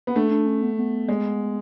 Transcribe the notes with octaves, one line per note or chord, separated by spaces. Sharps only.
B3
A3 D4
D4
C#4
B3
B3
G#3